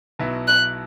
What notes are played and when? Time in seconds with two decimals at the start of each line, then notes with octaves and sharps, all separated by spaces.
0.19 B1 B2 F#3 B3 E4
0.48 F#6